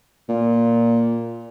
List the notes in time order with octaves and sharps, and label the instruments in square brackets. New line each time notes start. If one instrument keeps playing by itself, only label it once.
[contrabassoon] A#2